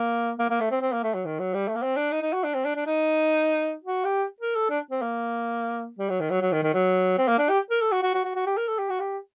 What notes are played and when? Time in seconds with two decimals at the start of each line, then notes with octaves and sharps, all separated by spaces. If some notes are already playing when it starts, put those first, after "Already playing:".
Already playing: A#3
0.39 A#3
0.50 A#3
0.60 A3
0.71 C4
0.81 C4
0.93 A#3
1.03 A3
1.14 F#3
1.25 D#3
1.39 F#3
1.54 G3
1.68 A3
1.75 A#3
1.82 C4
1.96 D4
2.11 D#4
2.22 D#4
2.33 F#4
2.44 D4
2.54 C4
2.65 D4
2.76 D4
2.87 D#4
3.84 F#4
4.05 G4
4.40 A#4
4.55 A4
4.69 D4
4.91 C4
5.02 A#3
5.98 G3
6.09 F#3
6.20 D#3
6.30 F#3
6.41 F#3
6.52 D#3
6.63 D#3
6.74 F#3
7.18 C4
7.28 A#3
7.38 D4
7.49 G4
7.70 A#4
7.81 A4
7.92 F#4
8.03 F#4
8.14 F#4
8.24 F#4
8.35 F#4
8.46 G4
8.57 A#4
8.68 A4
8.78 G4
8.90 F#4
9.00 G4